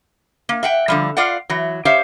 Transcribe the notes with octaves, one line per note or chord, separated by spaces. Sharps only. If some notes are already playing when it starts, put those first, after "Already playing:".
A#3
E5 F#5 G5
D3 F3 G3
F4 D5 F5 F#5
E3 F#3
G4 C5 C#5 E5 F5